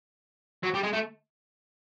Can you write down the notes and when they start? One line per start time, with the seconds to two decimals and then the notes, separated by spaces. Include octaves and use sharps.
0.63 F#3
0.74 G3
0.83 G#3
0.93 A3